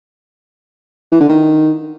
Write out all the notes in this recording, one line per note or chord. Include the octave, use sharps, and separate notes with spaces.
E3
D3
D#3